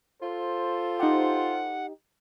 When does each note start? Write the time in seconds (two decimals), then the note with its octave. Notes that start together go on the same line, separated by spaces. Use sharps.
0.22 F4 A4 C5
0.99 D#4 G4 F#5